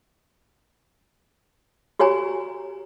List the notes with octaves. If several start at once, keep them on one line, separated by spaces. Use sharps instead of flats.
F#4 G4 C#5 G#5 A#5